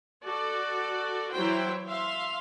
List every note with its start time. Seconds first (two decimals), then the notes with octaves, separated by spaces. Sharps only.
0.25 F#4 A4 D5
1.32 E3 F#3 E4 C5 G5
1.86 E5 F5 C6